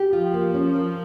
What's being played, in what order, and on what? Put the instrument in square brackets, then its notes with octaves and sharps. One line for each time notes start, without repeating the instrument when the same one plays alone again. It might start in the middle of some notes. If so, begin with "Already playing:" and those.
Already playing: [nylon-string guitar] G4
[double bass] F3 [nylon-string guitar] F4
[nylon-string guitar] A#3
C#4
A#4